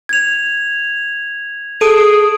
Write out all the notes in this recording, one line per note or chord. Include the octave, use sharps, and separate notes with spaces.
G#6 F7
G#4 A4 D#6 D7 D#7